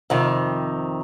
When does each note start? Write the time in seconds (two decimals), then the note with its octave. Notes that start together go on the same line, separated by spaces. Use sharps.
0.10 F2 C3 D#3